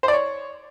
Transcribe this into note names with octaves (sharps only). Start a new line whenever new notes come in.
C5
D5
C#5